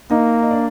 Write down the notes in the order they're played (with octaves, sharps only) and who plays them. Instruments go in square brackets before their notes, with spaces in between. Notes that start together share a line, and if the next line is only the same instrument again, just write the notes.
[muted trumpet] A#3 [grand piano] D#4 D#5
[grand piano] D#5
D4 D5